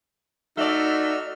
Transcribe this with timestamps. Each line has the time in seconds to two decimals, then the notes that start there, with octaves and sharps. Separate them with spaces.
0.57 A3 D#4 F#4 D5 E6 F6